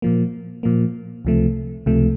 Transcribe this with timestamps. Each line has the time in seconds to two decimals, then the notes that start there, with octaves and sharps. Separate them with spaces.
0.02 A#2 F3 A#3
0.63 A#2 F3 A#3
1.25 C#2 C3 F3 A3
1.86 C#2 C3 F3 A3